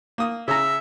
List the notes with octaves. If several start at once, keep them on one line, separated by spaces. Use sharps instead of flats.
A#3 D#6
C#3 E5 A#5